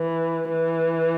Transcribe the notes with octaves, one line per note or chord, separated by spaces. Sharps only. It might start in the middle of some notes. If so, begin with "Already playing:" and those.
Already playing: E3
E3